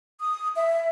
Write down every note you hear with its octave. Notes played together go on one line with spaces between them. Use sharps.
D#6
E5